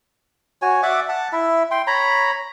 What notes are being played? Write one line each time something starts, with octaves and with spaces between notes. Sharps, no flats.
F#4 C#5 G#5
D5 E5 F#5 D6
F#5 A5
E4 E5
G5 C6
C#5 A#5 B5